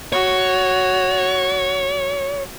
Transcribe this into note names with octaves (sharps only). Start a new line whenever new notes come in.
F#4 C#5